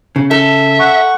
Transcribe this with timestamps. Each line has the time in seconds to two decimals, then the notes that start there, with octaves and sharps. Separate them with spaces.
0.16 C#3
0.31 A4 E5
0.79 F#5 C#6